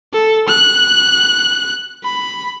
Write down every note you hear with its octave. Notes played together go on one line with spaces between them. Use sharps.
A4
F#6
B5